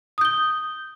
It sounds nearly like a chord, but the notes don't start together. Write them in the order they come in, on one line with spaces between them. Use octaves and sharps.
D#6 G6 G7